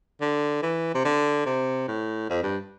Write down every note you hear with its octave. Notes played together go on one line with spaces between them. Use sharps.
D3
E3
C3
D3
C3
A2
F2
G2